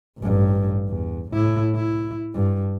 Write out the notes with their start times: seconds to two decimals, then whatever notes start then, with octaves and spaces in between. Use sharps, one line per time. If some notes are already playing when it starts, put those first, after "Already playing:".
0.18 A1 G2
0.88 E2
1.32 A2 E4
1.76 E4
2.34 G2